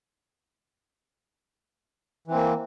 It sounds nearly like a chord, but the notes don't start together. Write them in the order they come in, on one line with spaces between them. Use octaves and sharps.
E3 C4 A#3